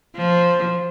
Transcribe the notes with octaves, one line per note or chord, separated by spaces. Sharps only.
F3